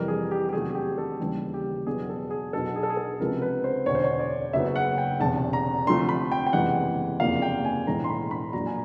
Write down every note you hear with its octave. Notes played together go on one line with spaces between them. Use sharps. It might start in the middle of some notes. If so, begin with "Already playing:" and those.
Already playing: F2 C3 E3 G3 A#4
G#4
G4
G4
E2 C3 D#3 F#3 A3 G#4
G#4
G4
A4
D#2 C#3 E3 G3
G4
E2 B2 F#3 B3 G#4
A4
G#4
B1 B2 F#3 B3 A4
G#4
A4
G#4
A4
C#2 C3 F3 G#3 B3 A#4
B4
C5
E1 D2 D3 C#5
C5
C#5
D5
F#1 F#2 C#3 F#3 B3 E5
F#5
G5
E1 E2 C3 A5
A#5
D2 C3 F3 A3 C6
B5
G5
G5
F#1 E2 C3 E3 G#3 F#5
F#1 E2 C3 F3 A#3 F5
G5
G#5
B1 A2 E3 G#3 A#5
C6
B5
B5
A#1 A#2 F#3 A#5
G#5